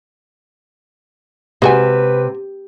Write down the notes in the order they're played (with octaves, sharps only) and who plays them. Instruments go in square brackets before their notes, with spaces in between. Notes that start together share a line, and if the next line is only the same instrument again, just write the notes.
[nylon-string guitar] C3 [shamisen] G#3 F#4 G#5 [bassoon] B4